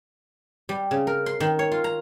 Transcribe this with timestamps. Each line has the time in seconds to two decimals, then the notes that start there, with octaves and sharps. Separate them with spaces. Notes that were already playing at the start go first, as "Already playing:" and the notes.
0.69 G3
0.91 C#3
1.07 A#4
1.26 C6
1.40 D#3
1.59 C#5
1.72 F4
1.84 A#5